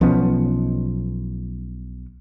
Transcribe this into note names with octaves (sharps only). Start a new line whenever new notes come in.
B1 F3 B3 C#4